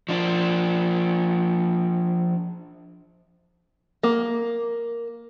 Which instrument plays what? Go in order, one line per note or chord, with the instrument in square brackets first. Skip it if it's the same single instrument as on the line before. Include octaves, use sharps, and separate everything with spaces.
[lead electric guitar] F3 D4
[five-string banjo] A#3